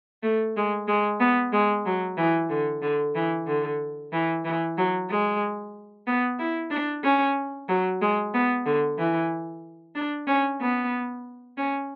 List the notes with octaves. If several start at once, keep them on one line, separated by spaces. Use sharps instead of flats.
A3
G#3
G#3
B3
G#3
F#3
E3
D3
D3
E3
D3
E3
E3
F#3
G#3
B3
E4
D4
C#4
F#3
G#3
B3
D3
E3
D4
C#4
B3
C#4